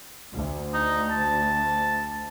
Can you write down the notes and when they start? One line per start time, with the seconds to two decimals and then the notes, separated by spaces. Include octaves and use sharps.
0.34 D2
0.74 D#4
1.11 A5